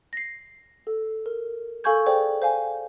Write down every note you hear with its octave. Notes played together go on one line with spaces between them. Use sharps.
A#6 C7
A4
A#4
A4 F5 G#5 C#6 G6 G#6
G#4 A4 C5 D5 G5
C5 F5 G#5